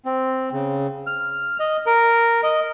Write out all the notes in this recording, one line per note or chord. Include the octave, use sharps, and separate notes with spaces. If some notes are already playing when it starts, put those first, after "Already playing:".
C4
C#3
F6
D#5
A#4
D#5